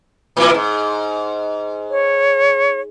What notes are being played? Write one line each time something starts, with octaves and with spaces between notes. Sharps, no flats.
A2 E3 E4
G#2
C#5